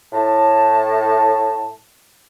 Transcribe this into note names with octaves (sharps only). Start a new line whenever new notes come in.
A2 A5